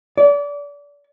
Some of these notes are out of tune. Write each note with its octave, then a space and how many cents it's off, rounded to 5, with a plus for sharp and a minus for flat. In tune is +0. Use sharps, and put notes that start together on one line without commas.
D5 -30